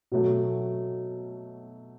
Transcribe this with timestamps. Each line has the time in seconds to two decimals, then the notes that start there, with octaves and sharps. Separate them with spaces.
0.12 B2 F#3 A3